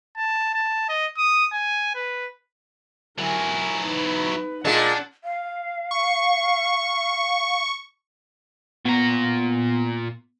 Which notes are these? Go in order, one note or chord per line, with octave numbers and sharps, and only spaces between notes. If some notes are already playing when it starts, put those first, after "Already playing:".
A5
A5
D#5
D#6
G#5
B4
F#3 E4 A#4 G#5
D#4 B4
A#2 G#3 D4 F#5
F5
C#6
A#2 B3 A#5